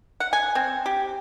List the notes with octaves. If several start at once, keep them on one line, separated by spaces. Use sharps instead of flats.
F#5
G#5
C4
G4